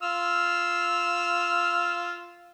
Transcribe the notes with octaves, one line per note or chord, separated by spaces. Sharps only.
F4 E6 F6